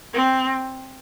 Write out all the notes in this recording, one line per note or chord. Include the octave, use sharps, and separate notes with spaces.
C4